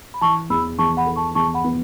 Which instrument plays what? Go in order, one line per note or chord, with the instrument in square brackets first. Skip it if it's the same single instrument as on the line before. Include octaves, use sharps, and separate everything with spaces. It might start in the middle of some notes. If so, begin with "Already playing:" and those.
[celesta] B5
[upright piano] E3 [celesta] A5 C#6
[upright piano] E2 [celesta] B5 E6
[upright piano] E2 [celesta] A5 C#6
[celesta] F#5 B5
[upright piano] A4
[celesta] A5 C#6
[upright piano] E2 [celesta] A5 C#6
[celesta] F#5 B5
[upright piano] B3